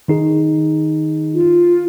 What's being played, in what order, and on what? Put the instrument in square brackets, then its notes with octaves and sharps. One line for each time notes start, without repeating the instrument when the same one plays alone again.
[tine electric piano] D#3 D#4 G#4
[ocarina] F4